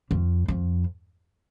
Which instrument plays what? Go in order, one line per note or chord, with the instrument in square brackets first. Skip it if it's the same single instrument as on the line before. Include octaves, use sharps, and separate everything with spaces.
[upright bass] F2
F2